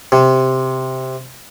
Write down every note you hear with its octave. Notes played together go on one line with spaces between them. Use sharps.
C3